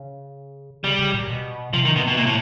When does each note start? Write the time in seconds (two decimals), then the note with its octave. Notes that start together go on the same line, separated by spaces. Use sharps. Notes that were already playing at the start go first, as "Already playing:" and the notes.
Already playing: C#3
0.84 C#3 G3
0.99 C#3
1.14 A#2
1.29 B2
1.74 C3 F3
1.85 D#3
1.96 B2
2.08 B2
2.17 A#2
2.26 A2